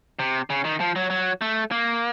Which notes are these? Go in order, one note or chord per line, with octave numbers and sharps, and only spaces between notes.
C3
C#3
D#3
F3
F#3
F#3
A3
A#3